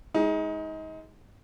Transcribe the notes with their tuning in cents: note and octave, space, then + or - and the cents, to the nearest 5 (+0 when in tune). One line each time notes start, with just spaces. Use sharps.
G#3 +0 D#4 +30